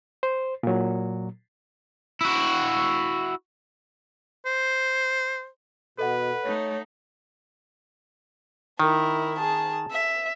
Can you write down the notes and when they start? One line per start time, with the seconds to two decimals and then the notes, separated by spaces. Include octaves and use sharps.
0.23 C5
0.63 A#2 F#3
2.21 E4 F#4
4.46 C5
5.98 B2 A4 B4 D#5 F#5
6.44 A3 D#4 C#5
8.80 D#3 E4 A#4
9.38 G#4 A5
9.91 E5